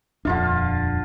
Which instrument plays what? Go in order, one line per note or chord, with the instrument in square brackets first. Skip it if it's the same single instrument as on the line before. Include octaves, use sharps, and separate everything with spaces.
[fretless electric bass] D#1 F2 D4 [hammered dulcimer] D3 F4 F5